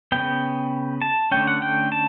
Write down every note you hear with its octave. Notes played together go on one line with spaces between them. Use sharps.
C#3 G3 B3 G5
A5
D3 A3 C#4 G5
F#5
G5
A5